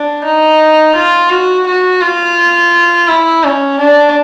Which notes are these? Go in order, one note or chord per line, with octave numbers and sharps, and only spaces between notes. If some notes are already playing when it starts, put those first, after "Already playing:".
Already playing: D4
D#4
F4
F#4
F#4
F4
E4
C#4
D4